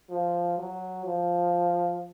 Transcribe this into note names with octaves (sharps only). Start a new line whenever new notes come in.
F3
F#3
F3